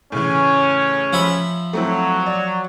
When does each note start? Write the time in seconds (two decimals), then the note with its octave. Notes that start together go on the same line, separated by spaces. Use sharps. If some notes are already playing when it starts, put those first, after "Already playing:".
0.12 A2 C#3 E3 C#4
1.13 F3 E5 B5
1.73 F#3 A3 C4 E4
2.26 D5